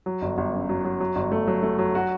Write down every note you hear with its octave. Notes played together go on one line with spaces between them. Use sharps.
F#3
G1
G1
F#2
F#3
F#3
F#3
G1
A3
F#3
A3
F#3
F#4